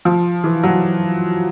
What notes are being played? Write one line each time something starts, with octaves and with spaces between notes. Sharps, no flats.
F3
E3
F#3